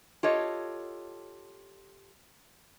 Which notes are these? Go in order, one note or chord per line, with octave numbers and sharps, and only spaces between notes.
F4 G4 A4 C#5 D#5